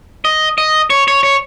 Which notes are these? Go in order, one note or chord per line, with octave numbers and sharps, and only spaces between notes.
D#5
D#5
C#5
C#5
C#5